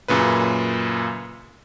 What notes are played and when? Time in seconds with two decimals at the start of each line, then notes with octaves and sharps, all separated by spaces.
0.08 F#2 A#2 C#3 B4